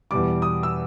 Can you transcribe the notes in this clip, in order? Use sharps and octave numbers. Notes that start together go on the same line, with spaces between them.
E2 B2 G3 D6
D#6
E6